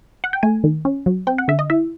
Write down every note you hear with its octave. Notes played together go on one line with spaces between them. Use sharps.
F#5
G5
A3 G#5
D#3
C#4
F#3
C4 G5
F#5
D3 E5
D#5
E4 E5